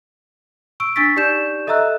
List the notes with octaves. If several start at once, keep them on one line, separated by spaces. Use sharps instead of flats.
C#6 E6 D7
D4 C#6 E6 A6 B6
D#4 G4 D5 C#6 G6 E7
A4 D#5 E5 A#5 E6 F#6